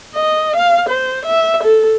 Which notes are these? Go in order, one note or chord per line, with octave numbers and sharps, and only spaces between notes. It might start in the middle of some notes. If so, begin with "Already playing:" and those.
D#5
F5
C5
E5
A4